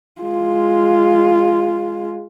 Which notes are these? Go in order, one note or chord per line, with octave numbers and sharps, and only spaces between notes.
G#3 F4